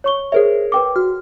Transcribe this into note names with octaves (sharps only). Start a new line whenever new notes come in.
C#5 C#6 G7
G#4 A#4 C5 C#5 E5
B4 G5 D6
F#4 F6